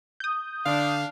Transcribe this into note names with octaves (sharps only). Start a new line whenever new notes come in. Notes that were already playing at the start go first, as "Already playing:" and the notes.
D#6 G6
D3 D4 F5